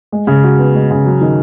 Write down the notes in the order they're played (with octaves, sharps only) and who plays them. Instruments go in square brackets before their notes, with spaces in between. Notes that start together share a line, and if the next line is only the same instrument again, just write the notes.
[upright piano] G#3
C#3
F#4
B3
G#3
C#3
F#3
D#3